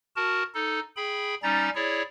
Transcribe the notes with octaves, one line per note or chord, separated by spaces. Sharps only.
F#4 A#4 A5
D#4 A4
G#4 G5 B5
G3 C#4 D#4 A#5 A6
E4 G#4 C#5 D5